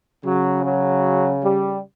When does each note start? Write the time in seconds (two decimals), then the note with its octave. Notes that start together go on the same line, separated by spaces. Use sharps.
0.25 C#3 F#3
0.64 F#3
1.44 G3